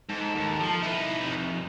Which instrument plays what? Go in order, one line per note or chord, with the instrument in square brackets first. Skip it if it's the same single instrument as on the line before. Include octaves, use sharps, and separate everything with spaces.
[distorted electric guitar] G#2 [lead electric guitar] A4
[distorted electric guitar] D#2
F3
[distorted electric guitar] D#4 B4 [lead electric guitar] E4
[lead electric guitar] F2 C3